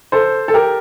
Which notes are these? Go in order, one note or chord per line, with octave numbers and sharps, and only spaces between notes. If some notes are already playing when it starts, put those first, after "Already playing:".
A4 C5
A4
G4 A#4